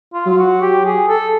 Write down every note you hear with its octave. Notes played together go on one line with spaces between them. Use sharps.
F4
F#3 F4
F#4
G4
G#4
A4